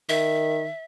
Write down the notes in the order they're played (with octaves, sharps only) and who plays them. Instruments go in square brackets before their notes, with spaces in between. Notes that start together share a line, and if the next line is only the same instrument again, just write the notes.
[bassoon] D#3 [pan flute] E5